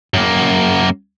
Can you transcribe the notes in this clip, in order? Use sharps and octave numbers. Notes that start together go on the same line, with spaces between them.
F#2 A#3